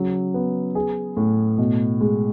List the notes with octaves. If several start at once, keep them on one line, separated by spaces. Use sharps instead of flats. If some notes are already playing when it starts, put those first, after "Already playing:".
Already playing: C#3 F#3
B3
G#4
A2
B2
G#3